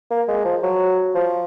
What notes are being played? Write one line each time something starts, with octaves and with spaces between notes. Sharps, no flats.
A#3
G#3
F3
F#3
F3